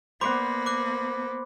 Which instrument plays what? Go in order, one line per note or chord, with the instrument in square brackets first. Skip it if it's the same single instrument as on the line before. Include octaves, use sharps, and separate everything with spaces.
[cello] A#3 B3 [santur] C5 D5 F#5 [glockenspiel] B5 D6
[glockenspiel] D6 F#6